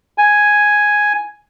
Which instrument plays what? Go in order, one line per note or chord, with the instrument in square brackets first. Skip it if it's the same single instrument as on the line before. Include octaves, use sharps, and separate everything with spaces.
[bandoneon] G#5